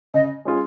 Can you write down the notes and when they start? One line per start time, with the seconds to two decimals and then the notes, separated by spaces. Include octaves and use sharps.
0.14 C#3 D#5
0.45 G#3 C#4 F4 G#4